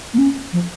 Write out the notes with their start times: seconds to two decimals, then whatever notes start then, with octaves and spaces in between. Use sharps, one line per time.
0.14 A#3
0.18 C#4
0.53 F3